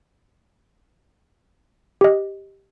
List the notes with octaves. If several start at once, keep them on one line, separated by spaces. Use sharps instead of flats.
G4 D#5